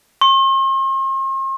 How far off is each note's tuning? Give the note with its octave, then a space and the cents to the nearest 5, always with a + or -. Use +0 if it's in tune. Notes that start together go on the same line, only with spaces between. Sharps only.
C6 +45